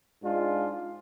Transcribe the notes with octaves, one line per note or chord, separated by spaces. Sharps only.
G#2 G#3 D4 F4